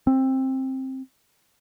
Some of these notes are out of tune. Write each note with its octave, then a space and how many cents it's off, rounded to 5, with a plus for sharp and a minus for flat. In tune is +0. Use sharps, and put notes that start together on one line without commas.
C4 +15